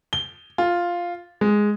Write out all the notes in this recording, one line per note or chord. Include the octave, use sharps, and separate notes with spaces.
G7
F4
G#3